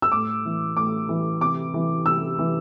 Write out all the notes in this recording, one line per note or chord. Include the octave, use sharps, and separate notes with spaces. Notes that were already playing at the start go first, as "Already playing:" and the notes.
E6
A2 D6
E3
A2 D6
E3
C3 D6
E3
C3 E6
E3